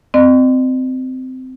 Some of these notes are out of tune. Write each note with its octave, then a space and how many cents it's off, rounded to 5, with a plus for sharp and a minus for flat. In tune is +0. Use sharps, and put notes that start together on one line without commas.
C4 -20 D#5 -45